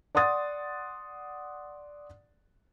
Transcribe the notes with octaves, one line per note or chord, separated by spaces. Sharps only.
D5 F#5 C6 D#6 A6